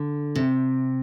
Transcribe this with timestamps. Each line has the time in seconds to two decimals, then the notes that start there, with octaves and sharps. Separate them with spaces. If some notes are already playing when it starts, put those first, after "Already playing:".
Already playing: D3
0.36 C3